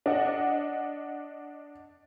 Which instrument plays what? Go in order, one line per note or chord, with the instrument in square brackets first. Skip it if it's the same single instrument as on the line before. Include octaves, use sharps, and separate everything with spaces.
[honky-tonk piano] D4 D#5 F#5